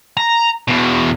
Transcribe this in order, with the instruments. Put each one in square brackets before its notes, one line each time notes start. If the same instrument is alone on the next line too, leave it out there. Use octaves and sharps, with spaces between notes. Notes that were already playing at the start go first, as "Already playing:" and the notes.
[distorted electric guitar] A#5
E2 B2